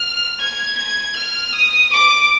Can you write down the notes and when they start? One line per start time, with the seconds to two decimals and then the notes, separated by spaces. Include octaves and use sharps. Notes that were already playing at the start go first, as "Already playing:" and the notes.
Already playing: F6
0.39 G#6
0.77 G#6
1.16 F6
1.53 D#6
1.92 D6